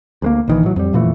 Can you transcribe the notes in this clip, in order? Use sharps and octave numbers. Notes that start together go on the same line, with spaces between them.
D2 G#3 A#3
A#1 D#3 E3
A2 F#3
F2 G3
F2 A#2 E3 A3